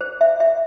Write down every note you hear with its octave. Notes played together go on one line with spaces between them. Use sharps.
C5
E5
E5